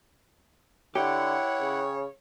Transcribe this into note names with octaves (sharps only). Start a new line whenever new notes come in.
D3 E4 G4 C#5 F#5
C#3